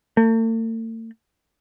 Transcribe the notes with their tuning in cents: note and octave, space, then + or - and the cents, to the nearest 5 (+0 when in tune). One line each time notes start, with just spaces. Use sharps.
A3 +45